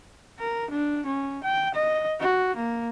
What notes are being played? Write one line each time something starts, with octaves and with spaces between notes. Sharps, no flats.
A#4
D4
C#4
G5
D#5
F#4
A#3